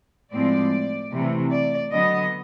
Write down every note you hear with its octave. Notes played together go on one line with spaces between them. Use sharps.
A2 F3 G#3 C4 D5
C3 E3 A3
D5
D3 F#3 B3 D#5